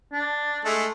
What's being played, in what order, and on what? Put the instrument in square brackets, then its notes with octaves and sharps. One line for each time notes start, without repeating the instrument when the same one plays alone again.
[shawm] D4
[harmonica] G#3 A3